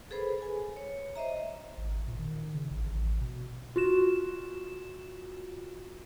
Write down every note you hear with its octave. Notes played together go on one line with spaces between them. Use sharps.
G#4 A4 B4 C5 B5
G#5
C#5
C5 D#5 E5 A#5
G#1
A#2
D#3
C#3
A1
A1
B2
F4 F#4 E7